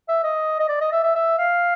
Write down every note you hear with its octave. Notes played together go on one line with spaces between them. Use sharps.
E5
D#5
D#5
D5
D#5
E5
E5
E5
F5